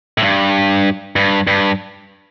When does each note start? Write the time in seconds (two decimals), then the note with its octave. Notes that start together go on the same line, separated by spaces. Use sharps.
0.18 A2
0.22 G2
1.16 G2
1.47 G2